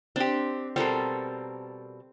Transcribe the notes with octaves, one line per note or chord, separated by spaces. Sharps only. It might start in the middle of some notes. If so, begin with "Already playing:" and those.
C4 D4 G4
B2 G3 C4 A4 A#4